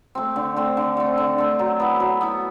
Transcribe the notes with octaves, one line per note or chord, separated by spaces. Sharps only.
A3 C4
D3
A3 C4
D3
A3 C4
D3
A3 C4
F#3
B3 E4
F#3
B3 E4